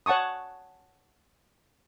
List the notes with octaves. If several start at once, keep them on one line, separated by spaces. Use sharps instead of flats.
C#5 F#5 A5 C#6 D#6